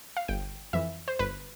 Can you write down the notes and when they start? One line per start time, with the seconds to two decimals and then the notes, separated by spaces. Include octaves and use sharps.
0.17 F5
0.28 G1 G5
0.73 F2 E3 E5
1.08 C5
1.19 G1 B4